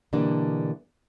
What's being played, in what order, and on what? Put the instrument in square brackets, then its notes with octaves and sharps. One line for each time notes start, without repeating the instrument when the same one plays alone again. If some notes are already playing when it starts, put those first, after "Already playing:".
[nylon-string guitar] B2 D3 E3 G3 A#3 D4